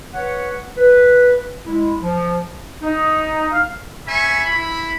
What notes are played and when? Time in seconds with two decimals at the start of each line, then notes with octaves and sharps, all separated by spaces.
0.14 B4 C#5 F#5
0.78 B4
1.66 G#3 E4
2.02 F3
2.81 D#4
3.51 F5
4.07 C#4 E5 G#5 B5 C#6
4.45 E4 B5